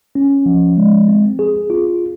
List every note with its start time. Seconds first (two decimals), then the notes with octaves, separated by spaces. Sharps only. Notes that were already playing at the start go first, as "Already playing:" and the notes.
0.15 C#4
0.46 F3
0.77 G#3
1.08 C4
1.39 G#4
1.70 F4